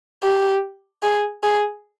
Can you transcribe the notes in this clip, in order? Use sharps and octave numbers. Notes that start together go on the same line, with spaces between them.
G4
G#4
G#4